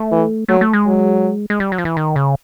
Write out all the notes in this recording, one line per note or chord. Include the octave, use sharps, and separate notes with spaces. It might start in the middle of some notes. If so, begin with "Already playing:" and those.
Already playing: A3
E3
F#3 A3
A3
G#3
F#3
G#3
G3
F#3
F3
E3
D#3
C#3